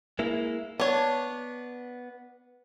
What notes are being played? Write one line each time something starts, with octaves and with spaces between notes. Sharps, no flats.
G#3 A#3 E4
B3 D4 C#5